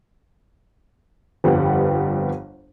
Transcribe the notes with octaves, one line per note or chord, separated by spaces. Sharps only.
G1 F2 G3 B3 F#5